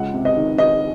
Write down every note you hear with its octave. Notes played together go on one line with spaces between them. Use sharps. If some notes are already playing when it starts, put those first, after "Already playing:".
Already playing: C#2 F#5
C3
D#5
D#3
D#3 D#5